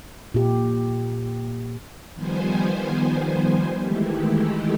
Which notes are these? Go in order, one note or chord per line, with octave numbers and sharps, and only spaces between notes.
A#2 G4
D#3 F3 G3 B3 C5 G#5
D#3 E3 G#3 A3 E4 G4